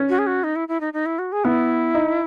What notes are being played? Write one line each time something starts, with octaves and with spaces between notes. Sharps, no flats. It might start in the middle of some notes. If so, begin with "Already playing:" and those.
Already playing: C#4
F#4
G#4
F#4
D#4
E4
E4
D#4
D#4
E4
F#4
G#4
B3 E4
D#4